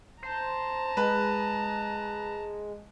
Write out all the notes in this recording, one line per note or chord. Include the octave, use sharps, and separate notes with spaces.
C5 A5 A#5
G#3 B4